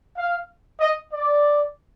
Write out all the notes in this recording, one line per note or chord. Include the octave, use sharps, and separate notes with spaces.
F5
D#5
D5